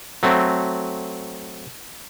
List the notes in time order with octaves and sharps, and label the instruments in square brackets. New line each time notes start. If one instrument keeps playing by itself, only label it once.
[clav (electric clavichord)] F#3 A3 C4